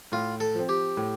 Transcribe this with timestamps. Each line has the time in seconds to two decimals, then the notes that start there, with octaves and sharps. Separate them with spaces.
0.12 A2 F4
0.40 A4
0.55 F3 C4
0.69 G4
0.97 A2